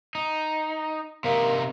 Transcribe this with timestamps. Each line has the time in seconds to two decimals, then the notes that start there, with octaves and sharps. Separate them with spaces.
0.15 D#4
1.24 C3 A#3 D#4